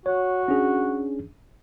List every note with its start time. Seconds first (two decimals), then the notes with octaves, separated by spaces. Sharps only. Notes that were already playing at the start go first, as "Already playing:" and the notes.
0.06 F#4 C#5
0.48 C#4 D4 G#4